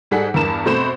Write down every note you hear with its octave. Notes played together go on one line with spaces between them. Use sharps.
G#2 G3 G#4 A4 F#5 B6
E2 G2 E3 A#4 A5 E7
B2 A3 C4 C5 B5 E7